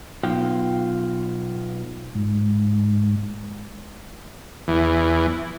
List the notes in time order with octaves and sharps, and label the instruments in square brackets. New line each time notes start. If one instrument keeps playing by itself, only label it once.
[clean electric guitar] B1 [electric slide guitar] F4 G5
[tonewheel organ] G#2
[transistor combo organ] E2